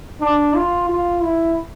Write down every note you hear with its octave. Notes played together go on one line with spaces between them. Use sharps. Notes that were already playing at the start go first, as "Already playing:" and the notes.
D4
F4
F4
E4